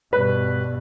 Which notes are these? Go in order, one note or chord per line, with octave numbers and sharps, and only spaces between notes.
G2 B2 B4